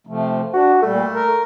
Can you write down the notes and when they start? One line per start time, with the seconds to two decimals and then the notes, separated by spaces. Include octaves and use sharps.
0.07 C3 F3 A3
0.53 D4 F#4
0.82 A#2 G3 A3
1.13 A#4